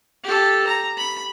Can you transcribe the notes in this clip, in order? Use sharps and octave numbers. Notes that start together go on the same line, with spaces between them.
G4 A4
A#5
B5